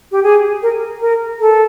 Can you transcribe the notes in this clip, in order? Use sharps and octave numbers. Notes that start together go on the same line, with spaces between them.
G4
G#4
A#4
A#4
A4